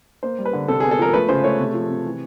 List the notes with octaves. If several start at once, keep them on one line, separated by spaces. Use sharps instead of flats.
A#3 C5
G3
B4
D3
C3 A4
B3 G#4
A4
F3 A#4
A3 B4
C#3 C5
A3 C#5
C3
F3
C3
E3